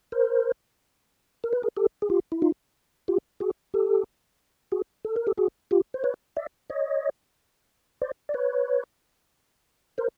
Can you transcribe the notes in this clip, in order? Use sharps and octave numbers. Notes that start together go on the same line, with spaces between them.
A#4 C5
A#4
B4
G#4 A#4
G4 A4
G#4
F4 G4
E4
D#4 F4
F4 G4
F#4 G#4
G4 A4
F#4 G#4
A4
A#4
G4 A4
F#4 G#4
F4 G4
C5
B4 C#5
D5 E5
C#5 D#5
C5 D5
D5
B4 C#5
A#4 C5